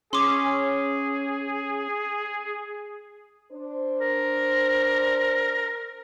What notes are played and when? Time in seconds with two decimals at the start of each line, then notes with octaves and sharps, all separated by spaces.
0.13 C#4 G#4 C6 D6
3.51 D4 C5
4.01 A#4